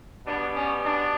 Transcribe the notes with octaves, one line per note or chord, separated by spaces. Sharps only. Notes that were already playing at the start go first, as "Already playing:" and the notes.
B2 G3 B3 D4
C#4
D4